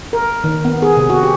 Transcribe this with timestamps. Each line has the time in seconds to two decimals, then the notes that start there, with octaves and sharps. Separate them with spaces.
0.13 A#4
0.44 D#3
0.65 B3
0.82 G#4
0.97 C3
1.10 F#4
1.23 G4